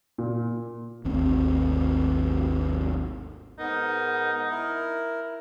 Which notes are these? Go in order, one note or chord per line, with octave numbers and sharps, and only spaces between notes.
A#2
G#1 D#2 A3 C4
G#2 B3 D#4 A#4
E4 A#4